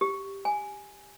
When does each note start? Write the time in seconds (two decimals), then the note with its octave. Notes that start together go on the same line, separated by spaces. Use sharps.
0.01 G4
0.45 G#5